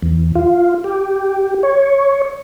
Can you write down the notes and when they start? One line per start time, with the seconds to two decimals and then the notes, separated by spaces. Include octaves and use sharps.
0.03 E2
0.35 F4
0.84 G4
1.63 C#5